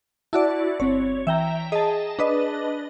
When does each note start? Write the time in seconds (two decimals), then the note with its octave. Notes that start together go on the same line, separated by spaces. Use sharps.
0.33 E4 F#4 D5 A5
0.80 G1 C4 C#5
1.27 E3 E5 G5 A#5
1.72 G#4 D#5 A5
2.19 D4 B4 D#5